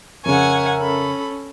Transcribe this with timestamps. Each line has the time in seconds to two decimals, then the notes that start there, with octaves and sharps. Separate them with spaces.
0.26 F2 C#3 C#4 A#4 C#5 E5 F#5 G#5
0.80 C#4 A4 B5